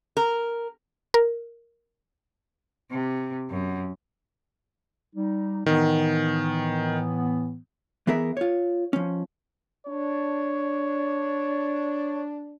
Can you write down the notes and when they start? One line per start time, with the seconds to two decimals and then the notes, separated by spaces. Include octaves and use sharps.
0.17 A#4
1.14 A#4
2.91 C3
3.50 F#2
5.15 G3 D#4
5.66 A2 D#3 E3 B3
8.07 E3 B3 G#4 A#4 E5
8.37 F4 C#5
8.93 F3 C#4
9.86 D4 C#5